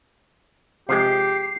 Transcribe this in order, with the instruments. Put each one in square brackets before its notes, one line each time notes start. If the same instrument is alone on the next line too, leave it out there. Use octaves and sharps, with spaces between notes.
[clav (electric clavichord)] C3 F3 G#3 [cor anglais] G4 [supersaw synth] C7